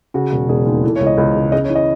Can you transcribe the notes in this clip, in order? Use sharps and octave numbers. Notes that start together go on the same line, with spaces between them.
C#3 F#4
E1
E1 G#4
D#2
E3 A4
C#5
C#2
D#5
C#2
C#3
C#3 D#5
C#5
E3
D#5